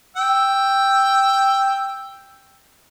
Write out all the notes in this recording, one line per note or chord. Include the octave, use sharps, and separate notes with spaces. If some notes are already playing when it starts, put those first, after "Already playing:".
G5 E6